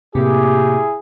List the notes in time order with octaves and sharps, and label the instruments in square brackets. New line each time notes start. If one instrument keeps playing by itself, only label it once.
[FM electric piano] A2 C3 A#3 [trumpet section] E4 G#4 [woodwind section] G4